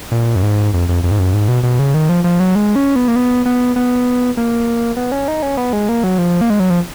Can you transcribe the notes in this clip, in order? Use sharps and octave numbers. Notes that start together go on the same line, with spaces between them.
A#2
F#2
G#2
F2
F2
F2
G#2
F#2
G#2
B2
B2
C#3
D#3
F3
F3
F#3
G#3
C#4
B3
A#3
B3
B3
B3
A#3
B3
C#4
D#4
C#4
B3
G#3
A#3
F#3
F3
A#3
G#3
F#3
F3